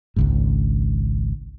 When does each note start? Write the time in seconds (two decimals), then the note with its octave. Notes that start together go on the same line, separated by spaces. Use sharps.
0.16 G#1 C#2 G#2